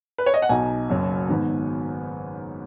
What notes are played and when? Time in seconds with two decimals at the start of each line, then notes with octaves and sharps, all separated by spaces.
0.18 B4
0.26 C#5
0.34 D#5
0.42 F#5
0.49 B1 B2 B3 D#4 G#5
0.89 F#1 F#2 F#3
1.29 G#2 D#3 B3